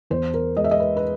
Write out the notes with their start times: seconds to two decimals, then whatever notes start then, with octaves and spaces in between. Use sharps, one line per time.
0.10 E2 C5
0.34 A#4
0.57 G#3 D#5
0.64 E5
0.71 D#5
0.80 B4
0.97 B4